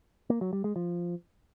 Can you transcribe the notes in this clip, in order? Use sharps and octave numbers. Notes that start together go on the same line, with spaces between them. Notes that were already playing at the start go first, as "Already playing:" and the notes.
A#3
F#3
G3
G#3
F3